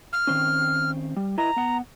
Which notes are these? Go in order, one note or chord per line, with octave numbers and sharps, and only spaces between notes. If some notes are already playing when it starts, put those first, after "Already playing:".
F6
D#3 C4 C#4
G3
E4 B4 D#5 A#5
B3 F#5